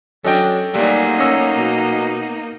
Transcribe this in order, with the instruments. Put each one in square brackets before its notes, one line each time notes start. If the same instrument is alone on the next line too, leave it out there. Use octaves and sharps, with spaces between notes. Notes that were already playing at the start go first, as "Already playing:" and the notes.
[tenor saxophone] F#3 [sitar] C#4 D4 [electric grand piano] A4 D#5 G5
[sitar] A#2 F#3 A3 [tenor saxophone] G3 [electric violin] A#3 D#4
[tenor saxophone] C#4 [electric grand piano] D#5 E6
[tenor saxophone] B2